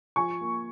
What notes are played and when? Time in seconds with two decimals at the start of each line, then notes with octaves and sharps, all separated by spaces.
0.16 F3 G#5 C#6
0.41 A#3